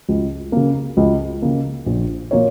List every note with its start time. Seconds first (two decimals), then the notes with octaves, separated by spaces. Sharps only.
0.09 C#2
0.52 C#3 A#3
0.97 C#2
1.42 C#3 A#3
1.86 A#1
2.31 A#2 A#3 F4 C#5